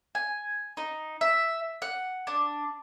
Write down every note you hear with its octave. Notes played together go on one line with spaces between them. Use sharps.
G#5
D#4
E5
F#5
D4